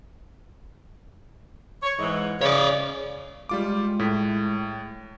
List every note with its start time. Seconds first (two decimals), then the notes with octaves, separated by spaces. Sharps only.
1.83 C#5
1.99 G#2 E3
2.41 C#3 C#5 D5
3.49 G3 G#3 F4 D6
3.99 A2 B6